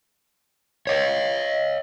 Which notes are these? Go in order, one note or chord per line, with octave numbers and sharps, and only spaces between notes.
C#5 D#5